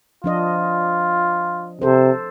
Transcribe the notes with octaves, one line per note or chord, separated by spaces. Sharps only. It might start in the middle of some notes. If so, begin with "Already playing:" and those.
F3 D4 F4 D#5
C3 A4 C5